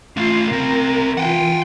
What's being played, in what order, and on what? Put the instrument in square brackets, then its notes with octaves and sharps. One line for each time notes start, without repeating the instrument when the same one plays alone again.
[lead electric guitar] A3 C#4 [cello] F4 F5
[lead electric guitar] C2 C4 [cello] A#4
[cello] E3 F4 [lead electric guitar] F#5 G5